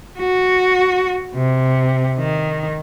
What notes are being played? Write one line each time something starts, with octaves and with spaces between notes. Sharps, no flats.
F#4
C3
D#3